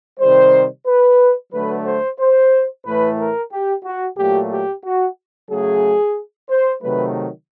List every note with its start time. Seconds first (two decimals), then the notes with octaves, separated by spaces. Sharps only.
0.20 C3 D#3 G3 C5
0.87 B4
1.53 D3 F#3 A3 B4
1.85 C5
2.20 C5
2.85 A2 E3 A3 B4
3.19 A#4
3.52 G4
3.84 F#4
4.18 A#2 F#3 A3 G4
4.51 G4
4.84 F#4
5.51 C#3 F#3 A3 G#4
6.49 C5
6.82 C3 D#3 F#3 A3 B4